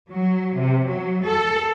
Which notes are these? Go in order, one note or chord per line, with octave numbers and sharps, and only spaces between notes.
F#3
C3
F#3
A4